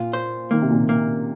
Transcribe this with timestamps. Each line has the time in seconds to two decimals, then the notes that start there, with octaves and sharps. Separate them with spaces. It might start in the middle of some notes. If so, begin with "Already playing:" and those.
Already playing: A#2 F4
0.13 C5
0.51 D#3 A#3
0.62 C3
0.71 A#2 D#3
0.89 A#3